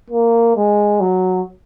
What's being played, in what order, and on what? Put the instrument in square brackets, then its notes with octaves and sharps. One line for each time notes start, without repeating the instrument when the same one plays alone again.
[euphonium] A#3
G#3
F#3